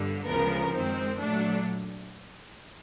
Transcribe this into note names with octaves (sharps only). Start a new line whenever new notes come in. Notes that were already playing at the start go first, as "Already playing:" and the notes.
Already playing: G1 G2 D3 G3
D2 C#3 F3 G#3 B3 A#4
F#2 D#3 G#3 C4
A#2 F#3 A3 D4